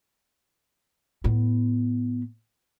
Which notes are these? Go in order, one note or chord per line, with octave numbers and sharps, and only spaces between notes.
A2 B3